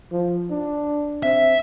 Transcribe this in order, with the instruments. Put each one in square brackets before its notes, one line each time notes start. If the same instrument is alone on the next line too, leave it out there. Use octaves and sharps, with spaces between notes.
[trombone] F3
D4
[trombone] C4 [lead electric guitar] E5